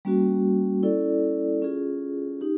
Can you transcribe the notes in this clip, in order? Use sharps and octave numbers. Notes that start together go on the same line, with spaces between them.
G3 A#3 C#4 F#4
C#4 E4 A4 D5
C#4 F4 G#4
D#4 G4